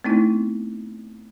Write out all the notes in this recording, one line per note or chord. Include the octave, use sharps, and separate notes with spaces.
A3 B3 C4 D#4 E4